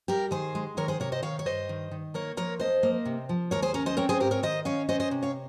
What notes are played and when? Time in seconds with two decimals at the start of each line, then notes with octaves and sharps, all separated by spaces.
0.08 G3 G4 A#4
0.31 D#3 G#4 C5
0.55 G#3
0.77 D#3 A#4 C#5
0.88 G#4 C5
1.00 C3 A#4 C#5
1.12 C5 D#5
1.23 D#3 C#5 F5
1.39 C#5
1.46 G2 C5 D#5
1.69 D#3
1.91 D#3
2.14 A#3 A#4 C#5
2.37 F3 A#4 C#5
2.60 F2 C5 D#5
2.83 A#3
3.05 C3
3.29 F3
3.51 D#2 A#4 C#5
3.62 G#4 C5
3.74 C#4 A#4 C#5
3.86 C5 D#5
3.97 C4 A#4 C#5
4.09 G#4 C5
4.20 G#2 G4 A#4
4.31 A#4 C#5
4.43 D#3 C5 D#5
4.65 C#4 C#5 F5
4.89 C#4 C5 D#5
5.00 C5 D#5
5.11 C3
5.23 C#5 F5